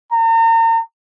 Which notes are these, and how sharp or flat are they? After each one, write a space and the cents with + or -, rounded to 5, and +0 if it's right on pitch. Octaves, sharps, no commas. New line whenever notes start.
A#5 -40